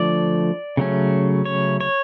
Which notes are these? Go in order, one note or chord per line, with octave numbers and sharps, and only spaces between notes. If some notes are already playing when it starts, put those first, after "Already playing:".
Already playing: D3 F3 A3 D5
C#3 F#3 A3 C#4
C#5
C#5